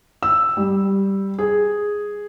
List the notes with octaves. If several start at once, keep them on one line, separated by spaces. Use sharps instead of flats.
E6
G3
G#4